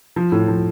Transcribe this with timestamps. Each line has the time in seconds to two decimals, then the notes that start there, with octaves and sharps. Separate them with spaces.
0.16 F3
0.32 A2
0.48 F3